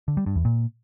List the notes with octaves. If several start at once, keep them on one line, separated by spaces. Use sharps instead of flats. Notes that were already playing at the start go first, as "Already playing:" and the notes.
D3
G3
G2
E2
A#2